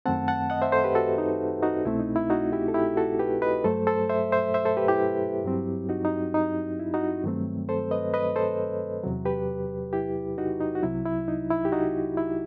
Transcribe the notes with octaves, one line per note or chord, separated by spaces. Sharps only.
F#2 D#3 A3 C4 F#5 A5
F#5 A5
D#5 F#5
C5 E5
A4 C5
G4 B4
F#4 A4
D#4
D#4 F#4
C2 B2 A3 C4 E4
D#4
E4
D#4 F#4
E4 G4
A4
E4 G4
F#4 A4
G4 B4
B4 D#5
G2 F#3 A3 A4 C5
A4 C5
C5 E5
C5 E5
C5 E5
A4 C5
G4 B4
E4 G4
G2 F#3 C4
D#4 F#4
D#4
D#4
E4
D#4 F#4
G2 D#3 F#3 A3 C4
A4 C5
B4 D#5
B4 D#5
A4 C5
E2 C3 F#3
G4 B4
E4 G4
D#4 F#4
D#4
F#4
C2 C3 F#3 E4
E4
D#4
E4
G4
D#4 F#4
E4